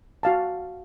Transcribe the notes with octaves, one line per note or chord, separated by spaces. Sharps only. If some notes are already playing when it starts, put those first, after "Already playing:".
F#4 F5 A5